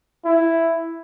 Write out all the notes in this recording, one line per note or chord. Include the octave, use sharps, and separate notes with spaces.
E4